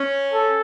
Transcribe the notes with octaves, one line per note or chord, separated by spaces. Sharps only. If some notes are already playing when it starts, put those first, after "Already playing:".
Already playing: C#4
A4